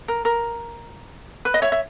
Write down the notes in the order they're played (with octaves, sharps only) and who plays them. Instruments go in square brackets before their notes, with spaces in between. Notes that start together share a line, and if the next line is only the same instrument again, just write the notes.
[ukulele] A#4
A#4
B4
D#5
C#5 E5
E5